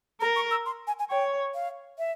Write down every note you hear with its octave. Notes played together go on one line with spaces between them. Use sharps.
A#4 A#5
C#6
E6
C6
G#5
G#5
C#5 G5
F5
E5